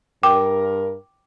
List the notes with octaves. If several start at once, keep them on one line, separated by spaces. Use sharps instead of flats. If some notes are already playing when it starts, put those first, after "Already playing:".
G2 A#4 G5 D6